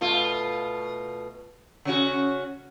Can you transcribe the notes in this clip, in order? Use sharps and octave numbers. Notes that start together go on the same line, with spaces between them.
B2 A3 F4
C#3 C#4 F#4